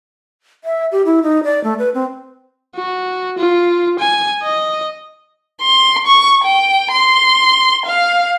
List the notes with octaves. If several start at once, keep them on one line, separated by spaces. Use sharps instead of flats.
E5
G4
E4
D#4
D5
A3
B4
C4
F#4
F4
G#5
D#5
C6
C#6
G5
C6
F5